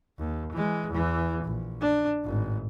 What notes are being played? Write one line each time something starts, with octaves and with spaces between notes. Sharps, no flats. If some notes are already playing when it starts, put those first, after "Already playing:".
D#2
E3 G#3
E2 E3
A#1
D4
G#1 A2